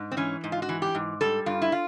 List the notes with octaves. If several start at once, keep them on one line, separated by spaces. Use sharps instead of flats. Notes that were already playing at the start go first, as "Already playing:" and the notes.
Already playing: G#2
C4
E3 C#4
G#2
F4
F#4
E3
G4
G#2
G3 A4
G2 F4
E4
F4